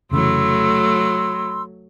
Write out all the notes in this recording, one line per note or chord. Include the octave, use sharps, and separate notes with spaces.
F1 C#3 E3 F#3 A3 B5 C6 E6